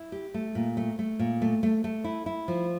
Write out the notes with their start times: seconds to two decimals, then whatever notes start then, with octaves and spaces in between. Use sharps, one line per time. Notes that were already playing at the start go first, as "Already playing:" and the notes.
Already playing: E4
0.12 G4
0.34 A3
0.55 A#2
0.77 A3
0.99 A3
1.19 A#2
1.42 A3
1.63 A3
1.84 A3
2.04 E4
2.26 E4
2.48 F3